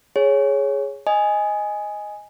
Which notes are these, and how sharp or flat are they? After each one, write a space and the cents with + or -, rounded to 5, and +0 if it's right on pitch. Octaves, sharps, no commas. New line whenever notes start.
G#4 +0 C#5 +0
D#5 +0 G#5 +0